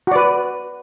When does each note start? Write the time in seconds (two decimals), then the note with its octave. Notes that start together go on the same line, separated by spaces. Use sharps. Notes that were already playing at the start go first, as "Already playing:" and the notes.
0.07 F#4
0.11 D5
0.16 B4